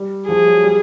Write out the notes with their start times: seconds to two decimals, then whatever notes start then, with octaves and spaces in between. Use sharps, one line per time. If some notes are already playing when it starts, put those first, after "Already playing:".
Already playing: G3
0.28 F3 G#4
0.46 F#3
0.63 G3